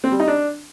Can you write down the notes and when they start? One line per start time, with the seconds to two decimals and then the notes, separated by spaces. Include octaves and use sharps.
0.04 C4
0.12 G3
0.20 D#4
0.28 D4